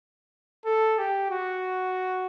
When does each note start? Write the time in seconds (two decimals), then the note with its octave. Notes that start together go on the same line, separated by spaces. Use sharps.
0.65 A4
0.98 G4
1.31 F#4